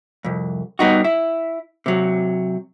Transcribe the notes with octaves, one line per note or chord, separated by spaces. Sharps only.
C2 F2
G3 B3 D#4 F#4
E4
C3 F#3